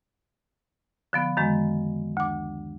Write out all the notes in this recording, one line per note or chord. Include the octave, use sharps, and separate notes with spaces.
D3 F3 B3
F#2 D#3 G#3
D2 D6